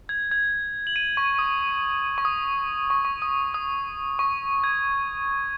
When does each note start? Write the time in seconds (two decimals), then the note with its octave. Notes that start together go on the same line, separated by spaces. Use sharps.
0.09 G#6
0.31 G#6
0.87 F#7
0.96 D#7
1.17 C#6
1.39 D#6
2.18 C#6
2.25 D#6
2.90 C#6
3.05 C#6
3.22 D#6
3.54 D#6
4.19 C#6
4.64 G#6